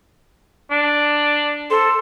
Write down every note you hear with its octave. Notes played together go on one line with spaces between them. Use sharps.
D4
A4 C5